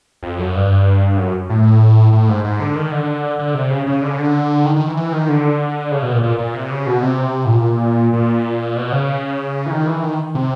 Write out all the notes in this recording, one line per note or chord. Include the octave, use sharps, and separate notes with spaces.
F2
F#2
G2
F#2
A2
A2
G#2
G#2
D3
D#3
D3
D3
C3
C#3
C#3
D3
C#3
D3
D#3
D#3
E3
E3
D#3
D3
C#3
B2
A#2
A#2
A#2
C3
C#3
B2
C3
A2
A#2
A#2
B2
C#3
E3
D#3
E3
D#3
C3